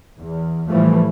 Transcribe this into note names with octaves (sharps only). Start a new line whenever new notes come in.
E2
A2 E3 F3 G3 A3